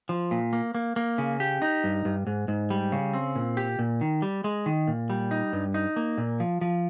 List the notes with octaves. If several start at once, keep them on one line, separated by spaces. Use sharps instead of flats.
F3
A#2
A#3
A#3
A#3
C#3
G4
D#4
G2
G2
G#2
G#2
G3
C#3
C4
A#2
G4
A#2
D#3
G3
G#3
D#3
A#2
G3
D#4
G2
D#4
A#3
A#2
F3
F3